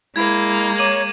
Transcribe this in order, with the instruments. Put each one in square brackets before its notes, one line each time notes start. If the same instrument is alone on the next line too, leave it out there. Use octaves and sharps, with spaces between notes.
[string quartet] G#3 A#3 [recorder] E4 [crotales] G#6
[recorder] C#5 [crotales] D6 D#7 F#7